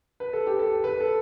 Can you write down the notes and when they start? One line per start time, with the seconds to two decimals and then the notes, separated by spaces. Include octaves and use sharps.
0.20 B4
0.33 A4
0.47 G4
0.59 A4
0.84 B4
1.00 A4